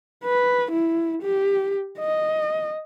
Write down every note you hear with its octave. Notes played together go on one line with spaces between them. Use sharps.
B4
E4
G4
D#5